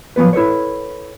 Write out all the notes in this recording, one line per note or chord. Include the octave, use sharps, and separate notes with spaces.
F3 F#3 B3 B4
E4 A4 B4 C#5